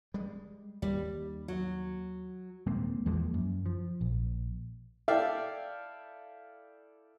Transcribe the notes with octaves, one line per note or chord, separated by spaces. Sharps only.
G3 G#3
D#2 G3
F#3
D#1 G#3 A#3 C4
E2 F3 G#3 A#3
F#2
F3
A#1
E4 A4 D5 E5 F5 G5